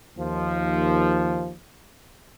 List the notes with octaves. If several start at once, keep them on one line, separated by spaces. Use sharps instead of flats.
D#2 F3